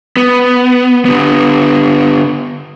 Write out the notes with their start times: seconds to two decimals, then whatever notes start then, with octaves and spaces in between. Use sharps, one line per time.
0.17 B3
1.05 D3 B3